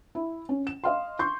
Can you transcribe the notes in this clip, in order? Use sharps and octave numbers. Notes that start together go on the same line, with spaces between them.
E4
C#4
E7
D#5 F5 C6
C6 C#6 G6